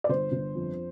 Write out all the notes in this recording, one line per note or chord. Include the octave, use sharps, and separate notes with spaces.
D5
G1 C5
G1
F2